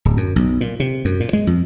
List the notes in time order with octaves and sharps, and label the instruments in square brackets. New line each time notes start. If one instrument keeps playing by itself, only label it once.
[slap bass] D1
F#2
B1
A#2
C3
F#2
A#2
G#3
F2